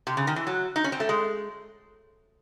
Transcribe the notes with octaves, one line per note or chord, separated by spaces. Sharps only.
C3
C#3
D#3
E3
F#3
D#4
C#4
C4
A3
G#3